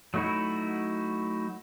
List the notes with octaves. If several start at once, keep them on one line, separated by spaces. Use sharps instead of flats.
F#3 A3 D#4 E4 F#4